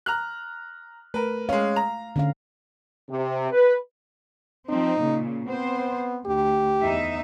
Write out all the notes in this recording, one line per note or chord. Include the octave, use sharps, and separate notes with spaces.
A#5 F6 F#6
A3 A#4 B4
G#3 C#4 F5
A#5
D3 C#4 F5
C3
B4
F3 C4 D#4
A#2 C#3
B3 C4 C5
D2 G4
E2 D#4 E5